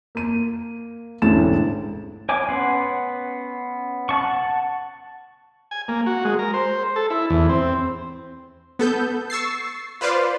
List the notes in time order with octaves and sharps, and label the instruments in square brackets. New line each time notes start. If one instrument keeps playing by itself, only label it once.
[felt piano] A#3 D#7
E1 A1 G#2 D3 A6 E7
[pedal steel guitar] C#5 G#5 D6
B3 C#4 F#5 C6
F#5 A5 C#6
[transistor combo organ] G#5
A#3
F#4
G#3
A#4
C5
A4
E4
E2
C4
[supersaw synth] B3 A4 G6
C#6 E6 A6 C7
F4 B4 C5 D5 F5 C6